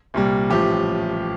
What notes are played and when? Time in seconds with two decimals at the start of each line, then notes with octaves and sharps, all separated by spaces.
0.14 C2 A#2 G3
0.50 A1 A2 F3 G4